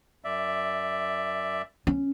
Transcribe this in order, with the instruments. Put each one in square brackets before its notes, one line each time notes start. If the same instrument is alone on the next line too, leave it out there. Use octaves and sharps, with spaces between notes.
[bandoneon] F#2 D5 E5
[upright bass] C#4